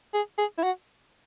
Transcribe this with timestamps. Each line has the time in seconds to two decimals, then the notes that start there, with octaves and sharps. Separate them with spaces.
0.14 G#4
0.38 G#4
0.58 E4
0.64 F#4